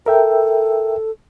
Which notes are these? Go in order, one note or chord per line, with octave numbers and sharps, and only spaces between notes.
A4 A#4 E5 G5